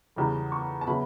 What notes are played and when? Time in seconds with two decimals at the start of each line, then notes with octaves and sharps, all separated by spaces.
0.16 E2 C#3 G3
0.52 C#6
0.81 A5
0.87 C#3 F#3 B3 E4 B5